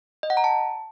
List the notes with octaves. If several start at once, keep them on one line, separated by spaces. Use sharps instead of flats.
D#5
F#5
A#5
A5